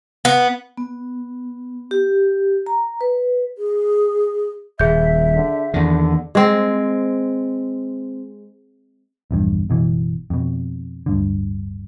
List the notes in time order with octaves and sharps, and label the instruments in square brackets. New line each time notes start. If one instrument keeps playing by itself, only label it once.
[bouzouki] B3
[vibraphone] B3
G4
A#5
B4
[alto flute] G#4
[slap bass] D#1 [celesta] G#4 G6 [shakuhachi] E5
[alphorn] D3
[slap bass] E2 D#3 [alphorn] D3
[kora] G#3 C4
[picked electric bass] A#1 E2 G2
F#1 B2 E3
F2 B2
D1 G2 D3